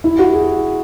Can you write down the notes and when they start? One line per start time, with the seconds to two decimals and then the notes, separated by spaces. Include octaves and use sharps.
0.04 E4
0.19 F#4
0.34 G#4